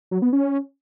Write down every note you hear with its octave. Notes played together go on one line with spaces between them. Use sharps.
F#3
B3
C#4